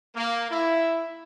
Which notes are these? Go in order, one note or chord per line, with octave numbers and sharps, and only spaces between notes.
A#3
E4